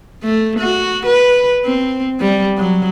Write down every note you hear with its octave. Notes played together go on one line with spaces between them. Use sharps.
A3
F#4
B4
C4
G3
F#3